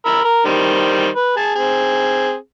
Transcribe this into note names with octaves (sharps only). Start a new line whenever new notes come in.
A#4 B5 E6
A#4
D#3 G3 C5
B4
G#4 A5
C4 G#4